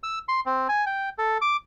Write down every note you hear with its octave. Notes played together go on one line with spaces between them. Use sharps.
E6
C6
C4
G#5
G5
A4
D6